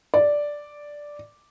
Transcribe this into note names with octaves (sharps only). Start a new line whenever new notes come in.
D5